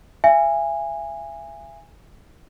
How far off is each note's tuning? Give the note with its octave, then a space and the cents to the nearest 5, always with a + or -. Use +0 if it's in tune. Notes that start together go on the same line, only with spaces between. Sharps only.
E5 +35 G#5 -20